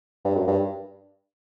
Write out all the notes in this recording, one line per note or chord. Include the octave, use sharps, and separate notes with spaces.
G2
F#2
G2